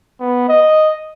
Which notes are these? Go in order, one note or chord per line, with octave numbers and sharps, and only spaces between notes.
B3
D#5